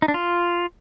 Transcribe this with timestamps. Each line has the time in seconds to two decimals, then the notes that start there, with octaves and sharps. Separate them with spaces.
0.02 D#4
0.08 D4
0.14 F4